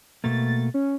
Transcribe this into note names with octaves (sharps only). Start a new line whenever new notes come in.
B2 A3 A#3 A6
C#4